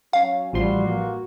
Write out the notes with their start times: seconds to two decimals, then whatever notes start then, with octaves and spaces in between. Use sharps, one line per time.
0.13 F#3 C#4 F5
0.53 A1 G2 F3 G3 F#4 C6
0.86 A#3